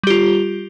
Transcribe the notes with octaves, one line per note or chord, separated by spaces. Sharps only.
G3 F4 G4